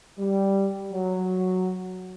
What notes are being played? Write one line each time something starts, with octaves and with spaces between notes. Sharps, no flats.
G3
F#3